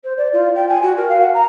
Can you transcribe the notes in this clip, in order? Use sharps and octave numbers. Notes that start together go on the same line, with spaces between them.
C5
D5
F4
G5
G#5
F#4
A#4
F5
F#5
A#5